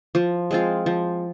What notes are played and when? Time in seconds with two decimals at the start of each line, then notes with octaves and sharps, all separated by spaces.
0.15 F3
0.51 G#3 C4 F4
0.86 F3